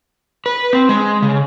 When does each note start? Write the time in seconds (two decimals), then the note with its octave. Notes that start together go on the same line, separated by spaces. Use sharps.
0.46 B4
0.73 C4
0.89 G#3
1.22 C#3